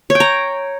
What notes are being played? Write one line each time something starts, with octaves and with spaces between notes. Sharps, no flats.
C#5
G5
A#5